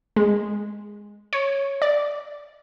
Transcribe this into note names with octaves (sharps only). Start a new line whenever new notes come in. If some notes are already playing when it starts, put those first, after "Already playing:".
G#3
C#5
D5